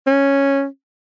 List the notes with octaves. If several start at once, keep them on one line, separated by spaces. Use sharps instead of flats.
C#4